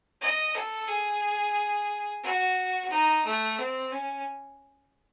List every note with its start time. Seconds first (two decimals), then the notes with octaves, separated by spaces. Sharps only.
0.21 D#5
0.55 A4
0.88 G#4
2.23 F#4
2.90 D#4
3.25 A3
3.58 C4
3.92 C#4